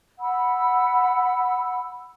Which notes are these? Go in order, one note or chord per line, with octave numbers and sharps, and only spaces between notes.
F#5 B5 E6